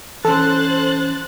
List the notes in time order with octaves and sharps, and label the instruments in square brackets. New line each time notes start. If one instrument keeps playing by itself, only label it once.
[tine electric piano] E3 C#4 [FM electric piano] A4 [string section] C5 F#6 A6